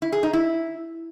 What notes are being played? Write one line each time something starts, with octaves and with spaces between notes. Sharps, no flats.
E4
G#4
D#4
E4